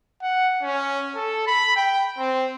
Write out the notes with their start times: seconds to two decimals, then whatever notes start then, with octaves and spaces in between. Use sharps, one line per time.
0.22 F#5
0.62 C#4
1.15 A4
1.47 B5
1.76 G5
2.18 C4